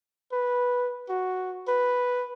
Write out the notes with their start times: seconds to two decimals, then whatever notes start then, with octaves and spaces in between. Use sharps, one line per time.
0.32 B4
1.09 F#4
1.68 B4